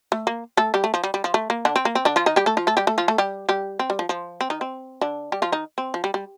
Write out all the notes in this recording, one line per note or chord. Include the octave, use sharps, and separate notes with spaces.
A3
A#3
A3 A4
G3 G4
A3
F3
G3
G3
F3
A3
A#3
D3 D4
C4
A#3
C4
D3 D4
F3 F4
D#3 D#4
G3 G4
A3 A4
F3 F4
A3 A4
G3 G4
A3 A4
F3 F4
A3 A4
G3 G4
G3 G4
C4
G3
F3
F3
C4
D#3 D#4
C4
D3 D4
G3 G4
F3 F4
D#3 D#4
C4
F3
G3
G3